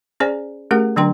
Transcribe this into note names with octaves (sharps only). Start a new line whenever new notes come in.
C#4 G#4 C5 D5 G#5
A3 C#4 G4 G#4 A#4 F#5
D3 F#3 D4 G5 A#5 C6